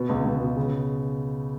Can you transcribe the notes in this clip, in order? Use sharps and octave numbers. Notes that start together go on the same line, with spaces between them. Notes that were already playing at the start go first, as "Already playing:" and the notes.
Already playing: B2
C#2
C#2
B2
C#3